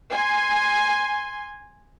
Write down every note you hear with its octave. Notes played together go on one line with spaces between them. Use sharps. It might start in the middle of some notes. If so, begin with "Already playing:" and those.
G#5 C6